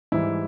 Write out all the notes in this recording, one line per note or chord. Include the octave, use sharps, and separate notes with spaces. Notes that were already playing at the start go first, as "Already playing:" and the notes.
G#2 E3 G3 E4